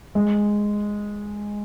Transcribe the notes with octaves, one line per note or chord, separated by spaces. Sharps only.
G#3